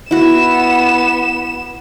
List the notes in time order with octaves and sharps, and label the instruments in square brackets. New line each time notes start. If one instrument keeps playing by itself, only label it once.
[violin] B3 E7 [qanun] E4 F#4